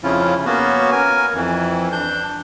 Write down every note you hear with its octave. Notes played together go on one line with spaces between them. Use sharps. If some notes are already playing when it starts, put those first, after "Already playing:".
F2 C#3 F3 C#4 E4 F4
A#3 B3 C#4 F#4
A#4 G#5
F2 E3
D4 G6